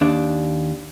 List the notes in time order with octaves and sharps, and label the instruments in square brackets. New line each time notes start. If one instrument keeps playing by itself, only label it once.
[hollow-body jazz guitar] D#2 D4